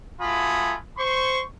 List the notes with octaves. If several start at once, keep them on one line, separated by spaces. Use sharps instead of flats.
A3 F4 F#4 G#5 B5 D#6
C5 C6 C#6